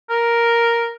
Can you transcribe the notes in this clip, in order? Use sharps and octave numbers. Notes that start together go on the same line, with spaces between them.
A#4